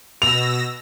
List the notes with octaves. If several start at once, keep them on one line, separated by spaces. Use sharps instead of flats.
B2 E6 A#6 F7